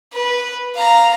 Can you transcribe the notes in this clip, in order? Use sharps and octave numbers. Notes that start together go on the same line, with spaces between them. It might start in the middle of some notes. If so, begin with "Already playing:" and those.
B4
F5 A#5